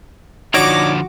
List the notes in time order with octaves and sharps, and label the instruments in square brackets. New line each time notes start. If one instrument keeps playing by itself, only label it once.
[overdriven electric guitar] D3 F3 [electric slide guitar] D#4 C#5 D5 [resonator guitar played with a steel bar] F#4 [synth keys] D6 A#6